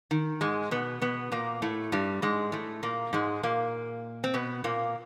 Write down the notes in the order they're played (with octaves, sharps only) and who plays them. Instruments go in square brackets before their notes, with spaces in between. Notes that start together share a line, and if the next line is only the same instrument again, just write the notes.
[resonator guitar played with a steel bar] D#3
G#2 G#3
B2 B3
B2 B3
A#2 A#3
A2 A3
G2 G3
G#2 G#3
A2 A3
A#2 A#3
G#2 G#3
A#2 A#3
C4
B2 B3
A#2 A#3